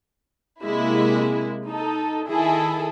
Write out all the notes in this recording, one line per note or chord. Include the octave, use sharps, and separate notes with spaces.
C3 G#3 A#3 E4
D#4 A4
D#3 E4 G#4 A4